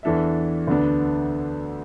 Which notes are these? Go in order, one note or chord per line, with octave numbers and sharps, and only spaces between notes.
E2 E3 D4 A4 E5
D2 D3 B3 D4